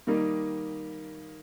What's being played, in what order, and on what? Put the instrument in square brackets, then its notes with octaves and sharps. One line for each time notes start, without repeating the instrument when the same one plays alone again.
[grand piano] D#3 G3 A#3 D#4